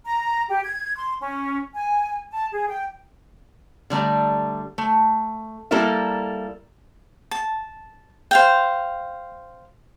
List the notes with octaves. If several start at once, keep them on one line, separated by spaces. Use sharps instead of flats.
A#5
G4
G#6
C6
C#4
G#5
A5
G#4
G5
D3 G3 A3 A#5
A3
G3 A#3 E4 A4 A#4 E5
A5
C5 F5 G5